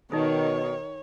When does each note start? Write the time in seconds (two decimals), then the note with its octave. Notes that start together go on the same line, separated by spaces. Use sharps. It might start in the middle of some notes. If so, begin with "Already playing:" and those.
0.12 B2 D#3 D#4 A4 C#5